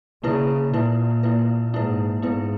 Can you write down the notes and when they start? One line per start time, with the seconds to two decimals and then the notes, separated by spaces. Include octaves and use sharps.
0.24 C#3 A#3 E4 B4
0.73 A#2 A#3 E4 B4
1.23 A#3 E4 B4
1.73 G#2 A#3 E4 B4
2.22 G#2 B3 E4 B4